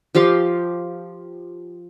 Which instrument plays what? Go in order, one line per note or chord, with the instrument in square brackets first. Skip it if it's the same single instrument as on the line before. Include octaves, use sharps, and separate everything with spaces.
[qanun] F3 G4 F5 C6